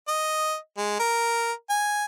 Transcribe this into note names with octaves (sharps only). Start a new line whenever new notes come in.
D#5
G#3
A#4
G#5